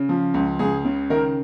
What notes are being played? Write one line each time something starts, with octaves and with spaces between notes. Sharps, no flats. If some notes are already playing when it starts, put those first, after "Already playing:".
Already playing: C#3
F3
C#2
C#2 G#4
C#3
D#3 A#4